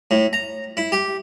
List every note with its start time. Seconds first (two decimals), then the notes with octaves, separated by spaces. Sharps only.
0.11 A2
0.33 A#5
0.77 E4
0.92 G4